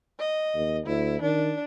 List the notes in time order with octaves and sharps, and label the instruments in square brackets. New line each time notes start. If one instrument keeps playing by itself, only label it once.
[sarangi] D#5
[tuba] D#2
[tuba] D2 [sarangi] E4
[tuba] D#3 [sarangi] D4